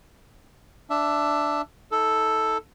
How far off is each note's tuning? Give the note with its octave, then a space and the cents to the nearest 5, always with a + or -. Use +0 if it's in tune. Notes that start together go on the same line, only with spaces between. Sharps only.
D4 +0 E5 +10
D#4 +45 A4 +0